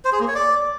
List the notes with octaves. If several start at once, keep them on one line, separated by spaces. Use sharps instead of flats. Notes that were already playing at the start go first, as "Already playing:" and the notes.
C5
G#4
A#3
C#5
D5